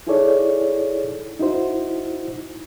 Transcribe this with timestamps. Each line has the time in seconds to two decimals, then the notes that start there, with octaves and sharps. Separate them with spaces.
0.07 D#4 E4 G#4 A4 C#5 D5
1.39 D#4 E4 F#4 C5